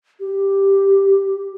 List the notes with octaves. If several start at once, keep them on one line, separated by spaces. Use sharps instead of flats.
G4